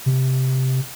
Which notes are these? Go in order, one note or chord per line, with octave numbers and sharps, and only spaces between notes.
C3